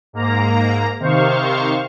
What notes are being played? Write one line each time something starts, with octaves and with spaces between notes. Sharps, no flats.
G#2 A#3 A#5
C3 D#3 C5 F5 C#6